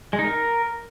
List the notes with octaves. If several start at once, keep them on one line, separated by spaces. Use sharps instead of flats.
G#3
D#4
A#4